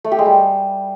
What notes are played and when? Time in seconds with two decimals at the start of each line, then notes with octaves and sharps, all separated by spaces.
0.04 A3
0.11 G4
0.19 G#3
0.26 G3